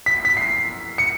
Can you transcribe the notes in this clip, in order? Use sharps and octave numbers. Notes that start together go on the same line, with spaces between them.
B6
B6
C7
C#7